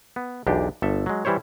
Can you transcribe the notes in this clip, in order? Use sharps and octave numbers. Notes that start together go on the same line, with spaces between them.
B3
B1 E2 D4 G4
G1 A4 E5
F#3 G#3
E3 G3 E4 C5 C#5